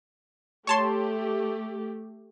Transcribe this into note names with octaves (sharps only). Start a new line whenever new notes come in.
A3 G4 C#5 A5 C6